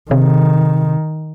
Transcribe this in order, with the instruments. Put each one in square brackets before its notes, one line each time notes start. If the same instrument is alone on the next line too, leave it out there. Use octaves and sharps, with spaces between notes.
[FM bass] C3 [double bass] D#3